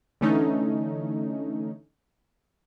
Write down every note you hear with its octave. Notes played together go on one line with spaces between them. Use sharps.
D3 E3 A3 C#4 D#4